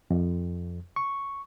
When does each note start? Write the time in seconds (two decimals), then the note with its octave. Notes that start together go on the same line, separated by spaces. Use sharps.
0.10 F2
0.96 C#6